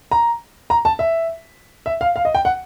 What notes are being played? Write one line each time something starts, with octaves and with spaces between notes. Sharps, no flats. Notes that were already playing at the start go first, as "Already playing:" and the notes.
A#5
A#5
A5
E5
E5
F5
F5
D#5
G5
F#5